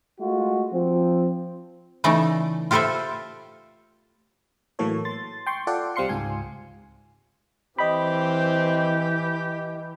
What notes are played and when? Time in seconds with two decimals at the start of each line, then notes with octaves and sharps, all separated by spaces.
0.21 G#3 A3 F4 F#4
0.73 F3 C4
2.04 C#3 E3 A3 D#4 D5
2.71 F4 G4 A4 B4 C5 E5
4.79 A2 E3 F#3 A#3 A4 C#5
5.05 C6 A6
5.46 G5 C6 C#6
5.67 F4 A4 D5 F#5 G5
5.96 C2 G3 C4 F5 C6 C#7
6.09 C#2 G#2 F4 G#5
7.78 E3 C4 G4 D#5 G5 B5